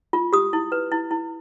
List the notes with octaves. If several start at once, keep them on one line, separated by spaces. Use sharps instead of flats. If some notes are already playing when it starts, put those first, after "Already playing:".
F4
G4 D#6
E4
B4
E4
E4